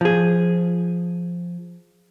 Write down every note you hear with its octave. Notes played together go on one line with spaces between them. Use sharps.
F3 G#4